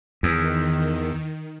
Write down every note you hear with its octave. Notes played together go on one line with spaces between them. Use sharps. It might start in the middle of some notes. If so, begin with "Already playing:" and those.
E2 D#3